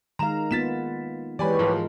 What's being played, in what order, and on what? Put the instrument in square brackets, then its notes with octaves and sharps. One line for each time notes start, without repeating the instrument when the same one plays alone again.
[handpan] D#3 G#3 F5 [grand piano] A#5 E7
[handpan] A#3 B3 F4 [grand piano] A6 B6 E7
[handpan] E3 G#3 [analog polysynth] G4 B4 C#5 [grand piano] D5 G#5 B5
[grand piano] G#2 F3 [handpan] G#3 F4 A#4